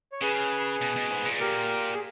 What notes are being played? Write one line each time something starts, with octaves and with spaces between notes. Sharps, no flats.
C#5
C#3 G#4 B4
B2
B2
G#2
A#2
G4 A#4
G#4